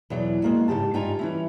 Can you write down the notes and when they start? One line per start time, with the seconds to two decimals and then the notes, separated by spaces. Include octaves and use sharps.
0.10 E2 B2 F#3 D5
0.42 G#3 A#3 F#4
0.68 G#2 C#3 G4 A5
0.94 G2 D#4 F4 G5 G#5 A#5
1.19 E3 C#4 E4